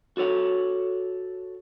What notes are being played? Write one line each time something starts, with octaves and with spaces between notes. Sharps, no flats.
F#4 A4 C#5 F#5